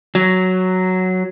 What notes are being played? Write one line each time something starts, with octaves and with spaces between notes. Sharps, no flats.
F#3